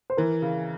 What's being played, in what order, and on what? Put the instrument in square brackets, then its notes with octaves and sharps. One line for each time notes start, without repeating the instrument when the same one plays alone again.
[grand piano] C5
[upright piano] E3 [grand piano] A#4
[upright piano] C#3